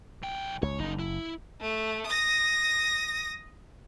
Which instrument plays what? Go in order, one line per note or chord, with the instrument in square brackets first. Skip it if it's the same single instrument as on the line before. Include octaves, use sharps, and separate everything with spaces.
[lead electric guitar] B1 G5
[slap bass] C#2 [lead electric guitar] C#5
[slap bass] F#1 [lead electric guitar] F2 D#4
[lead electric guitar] E4
[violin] A3
D#6 A#6